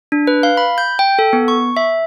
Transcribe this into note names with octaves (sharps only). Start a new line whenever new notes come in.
D4
B4
F5
B5
G6
G5
A4
B3
C#6
E5